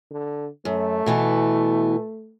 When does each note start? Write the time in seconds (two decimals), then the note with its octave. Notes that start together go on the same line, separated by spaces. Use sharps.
0.11 D3
0.65 F#2 A3
1.06 B2 E3 B3